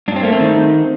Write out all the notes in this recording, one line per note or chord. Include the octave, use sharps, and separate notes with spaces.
G2 D4
C4
A3 A#3
C4
D#3